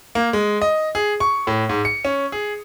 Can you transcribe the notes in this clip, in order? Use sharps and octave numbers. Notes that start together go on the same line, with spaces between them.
A#3
G#3
D#5
G#4
C#6
A2
G#2
C#7
C#4
G#4